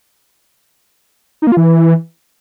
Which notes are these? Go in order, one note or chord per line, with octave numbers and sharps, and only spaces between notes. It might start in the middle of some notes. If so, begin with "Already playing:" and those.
D#4
A#3
F4
E3